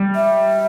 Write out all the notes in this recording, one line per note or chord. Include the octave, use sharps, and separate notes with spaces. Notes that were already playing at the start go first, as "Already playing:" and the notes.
Already playing: G3
E5